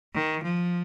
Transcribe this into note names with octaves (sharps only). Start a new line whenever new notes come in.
D#3
F3